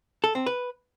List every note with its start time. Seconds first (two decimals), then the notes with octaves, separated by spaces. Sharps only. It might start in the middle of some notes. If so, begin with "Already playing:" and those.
0.24 A4
0.35 C4
0.46 B4